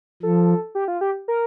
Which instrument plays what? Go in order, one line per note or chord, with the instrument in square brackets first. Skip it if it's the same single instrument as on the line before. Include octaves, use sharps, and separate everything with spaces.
[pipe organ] F3 [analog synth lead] A4
[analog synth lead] G4
F4
G4
A#4